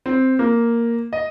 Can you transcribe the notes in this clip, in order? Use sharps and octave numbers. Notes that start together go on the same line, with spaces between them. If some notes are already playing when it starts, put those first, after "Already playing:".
C4
A#3
D#5